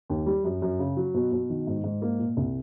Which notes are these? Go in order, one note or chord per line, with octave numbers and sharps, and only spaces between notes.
D#2
G3
F#2
F#2
C#3
F#3
B2
B2
D#3
G#2
G#2
A#3
A#2
C2